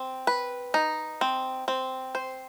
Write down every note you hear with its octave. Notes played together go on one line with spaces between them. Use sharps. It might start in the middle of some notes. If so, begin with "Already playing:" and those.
Already playing: C4
B4
D#4
C4
C4
C5